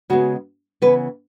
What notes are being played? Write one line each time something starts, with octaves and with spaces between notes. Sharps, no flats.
C#3 G#3 B3 F#4
C#3 E3 B3 B4